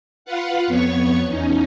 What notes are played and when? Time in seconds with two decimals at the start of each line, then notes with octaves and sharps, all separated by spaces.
0.25 F4 B4 F5 F#5
0.67 F2 B3 C#5 C#6
1.26 E2 C#4 D#4